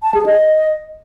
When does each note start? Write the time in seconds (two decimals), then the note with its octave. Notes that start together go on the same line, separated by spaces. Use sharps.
0.03 A5
0.14 G#4
0.26 D#5